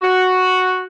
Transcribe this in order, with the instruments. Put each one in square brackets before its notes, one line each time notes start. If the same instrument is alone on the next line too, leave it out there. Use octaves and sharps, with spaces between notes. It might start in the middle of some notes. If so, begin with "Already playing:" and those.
[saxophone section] F#4